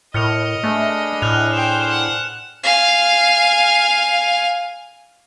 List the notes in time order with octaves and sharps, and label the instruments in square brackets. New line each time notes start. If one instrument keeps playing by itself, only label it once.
[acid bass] A2 [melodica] A#4 [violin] D#5 [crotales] F6 C#7 F7
[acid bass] A3 [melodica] D4 G#4 B4
[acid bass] A2 [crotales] F6 F#6 F7
[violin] C5 G5 [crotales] E7
[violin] F#5 [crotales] E7
[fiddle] F5 G#5